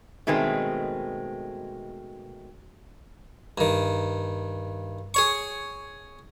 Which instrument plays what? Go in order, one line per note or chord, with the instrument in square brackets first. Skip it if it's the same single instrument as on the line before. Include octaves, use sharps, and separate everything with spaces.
[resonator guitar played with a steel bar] B2 D#3 G#3 A3 C4
[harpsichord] G2 D#3
G#4 C#5 C#6